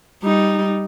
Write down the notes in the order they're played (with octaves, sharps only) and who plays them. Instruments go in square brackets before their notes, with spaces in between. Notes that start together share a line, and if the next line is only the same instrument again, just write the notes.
[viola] G3 D#4